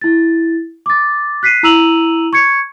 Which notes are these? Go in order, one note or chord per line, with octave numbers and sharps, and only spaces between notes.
E4 A6
D6 A6
F#6 B6 C7 D#7
E4 A#5 E6 D#7 F7 F#7
C#6 G#6 C#7